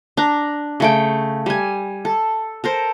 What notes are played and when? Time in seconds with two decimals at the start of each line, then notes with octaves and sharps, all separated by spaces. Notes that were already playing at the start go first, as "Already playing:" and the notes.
0.17 D4 A#5
0.80 C#3 A3 G5
1.46 G3 G#5
2.05 A4
2.64 A4 A#4 C5